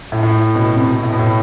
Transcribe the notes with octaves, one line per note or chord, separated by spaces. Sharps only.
A2
A2
B2
C3
B2
A2
B2
A2